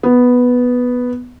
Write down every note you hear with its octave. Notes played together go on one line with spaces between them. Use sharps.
B3